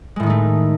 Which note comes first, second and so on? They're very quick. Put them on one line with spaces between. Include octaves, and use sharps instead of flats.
G#3 A2 D#3 D#4 A3